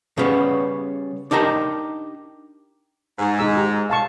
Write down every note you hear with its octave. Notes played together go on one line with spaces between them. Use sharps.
C#3 G3 B3 C#4
D4 D#4 G4 A#4 A#5
G#2
D#4 G#4 E6
G4 A#5
F5 A5 C#6